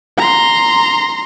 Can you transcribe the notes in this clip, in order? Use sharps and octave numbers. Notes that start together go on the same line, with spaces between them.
A#5 C6